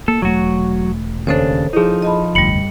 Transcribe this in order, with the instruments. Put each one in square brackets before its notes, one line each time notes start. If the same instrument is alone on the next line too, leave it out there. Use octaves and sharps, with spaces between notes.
[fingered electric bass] A#3 [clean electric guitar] A4
[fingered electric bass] E1 A3 [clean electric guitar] F#3 F#4
[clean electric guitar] D#2 C#3 D4 [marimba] A4 C5 C#5
[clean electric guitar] F3 D#4 [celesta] E4 G#4
[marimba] D#5 A5 B5
[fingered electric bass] F1 D2 [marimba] G2 G3 [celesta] C#7 F#7